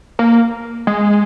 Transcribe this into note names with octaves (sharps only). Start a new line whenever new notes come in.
A#3
G#3